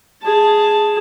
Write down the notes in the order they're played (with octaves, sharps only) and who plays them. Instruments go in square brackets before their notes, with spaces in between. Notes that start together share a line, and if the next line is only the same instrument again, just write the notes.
[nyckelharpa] G#4 A5